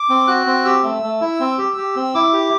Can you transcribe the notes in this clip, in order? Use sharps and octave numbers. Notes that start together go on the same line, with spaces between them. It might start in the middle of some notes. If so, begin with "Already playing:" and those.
Already playing: D6
C4
F#4 F#6
C4
G4 E6
A3
A3
E4
C4
G4
G4
C4
E4 D6
G4